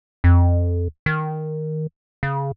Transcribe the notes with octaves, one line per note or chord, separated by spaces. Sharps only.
F2
D#3
C#3